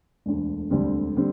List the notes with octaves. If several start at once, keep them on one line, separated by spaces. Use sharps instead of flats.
E1 D2 D3
E1 D2 D3 G3 C4
D3 G3 C4